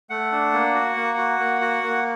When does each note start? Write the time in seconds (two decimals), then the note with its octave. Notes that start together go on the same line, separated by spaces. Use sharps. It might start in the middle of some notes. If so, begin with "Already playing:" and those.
0.10 A3 F#5
0.32 D4
0.54 A#3
0.75 F#4
0.96 A#3
1.18 F#4
1.40 A#3
1.61 F#4
1.83 A#3